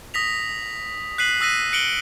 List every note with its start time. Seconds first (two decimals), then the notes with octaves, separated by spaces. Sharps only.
0.14 D#6 A#6 B6 F7
1.18 F#6 B6 C7 D#7 F#7
1.41 D#6 E6 F#6 A#6 B6 D#7
1.72 F#6 C#7 D7 F#7 G7